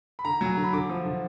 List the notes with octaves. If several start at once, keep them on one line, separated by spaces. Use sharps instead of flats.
B5
D3 A#5
F#3 G#5
D3 A#5
B5
D3 D6
F3
D3